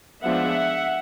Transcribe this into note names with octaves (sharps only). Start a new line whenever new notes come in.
F3 G#3 B3 D4 E5 F#5